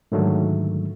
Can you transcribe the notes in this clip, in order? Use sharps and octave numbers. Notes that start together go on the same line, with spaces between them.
G#2 D3 D#3 F#3 G3 A3